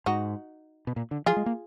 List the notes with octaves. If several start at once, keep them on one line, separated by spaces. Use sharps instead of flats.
G#2 D#4 F#4
B2
A#2
D3
F3 F4 G#4
G#3
A#3